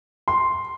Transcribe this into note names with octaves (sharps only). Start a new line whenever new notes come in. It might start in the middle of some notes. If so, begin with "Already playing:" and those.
C6